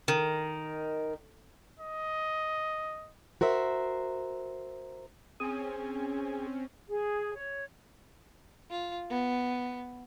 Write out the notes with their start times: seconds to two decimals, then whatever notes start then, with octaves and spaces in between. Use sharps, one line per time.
0.08 D#3
1.79 D#5
3.41 F#4 A#4 C5 E5
5.40 C4 C#4 G#4 G#5
6.89 G#4
7.35 C#5
8.70 F4
9.09 B3